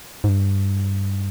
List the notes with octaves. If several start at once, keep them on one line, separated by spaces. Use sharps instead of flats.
G#2
G2